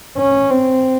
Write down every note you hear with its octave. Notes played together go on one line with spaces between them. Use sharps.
C#4
C4